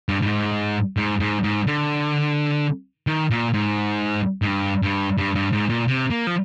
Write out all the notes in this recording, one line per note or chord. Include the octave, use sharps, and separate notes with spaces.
G2
G2
G#2
G#2
G#2
G#2
D3
D#3
A#2
G#2
G#2
G2
G2
G2
G2
G#2
A#2
C3
A#3
F3